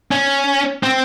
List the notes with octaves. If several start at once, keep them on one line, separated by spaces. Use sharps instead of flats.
C#4
C4